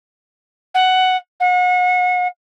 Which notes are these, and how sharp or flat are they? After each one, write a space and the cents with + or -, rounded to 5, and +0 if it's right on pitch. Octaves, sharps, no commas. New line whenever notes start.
F#5 +5
F#5 -35